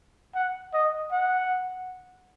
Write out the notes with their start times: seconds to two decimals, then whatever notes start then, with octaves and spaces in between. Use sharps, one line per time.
0.35 F#5
0.73 D#5
1.11 F#5